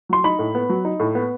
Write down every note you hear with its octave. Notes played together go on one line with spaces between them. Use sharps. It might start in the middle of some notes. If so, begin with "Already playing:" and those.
F#3 C6
D#4 B5
A2
B3
F#3
D#4
A2
B3